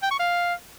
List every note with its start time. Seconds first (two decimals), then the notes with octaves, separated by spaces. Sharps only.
0.03 G5
0.11 C#6
0.20 F5